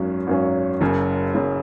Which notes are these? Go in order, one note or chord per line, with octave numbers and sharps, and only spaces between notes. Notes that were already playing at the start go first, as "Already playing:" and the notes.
Already playing: G#1 F#2 F#3 C#4
G#1 F#2 F#3 C#4
F#1 F#2 C#3
F#1 F#2 C#3